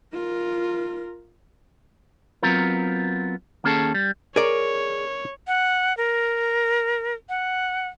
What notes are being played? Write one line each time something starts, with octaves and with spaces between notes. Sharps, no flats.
F4 A#4
F#3 B3 C4 F4 A#4
D#2 A#3 C#4 G#4 A4 A5
G3
G#4 A#4 C#5 D5
F#5
A#4
F#5